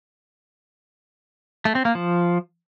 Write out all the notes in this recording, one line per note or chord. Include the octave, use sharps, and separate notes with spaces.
A3
C4
A#3
F3